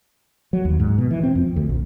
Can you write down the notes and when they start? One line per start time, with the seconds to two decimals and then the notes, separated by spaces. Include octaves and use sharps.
0.53 F#3
0.65 D#2
0.80 G#2
0.98 B2
1.11 E3
1.23 C4
1.35 F2
1.56 D2
1.69 A#1